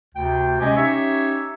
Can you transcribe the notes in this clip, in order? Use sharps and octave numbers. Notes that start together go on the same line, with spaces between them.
D2 C3 G5
C3 G#3 C#4 G4 D#5 G#5
C#4 D#4 G4 C#5 E5